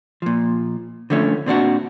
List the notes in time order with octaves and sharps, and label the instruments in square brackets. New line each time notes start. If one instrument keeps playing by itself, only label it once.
[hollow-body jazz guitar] A#2 F3
D3 F3 A3 C#4
A#2 C4 D4 F#4